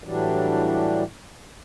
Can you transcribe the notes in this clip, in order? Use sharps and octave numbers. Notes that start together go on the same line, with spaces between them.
A2 E3 F#3 G3 D4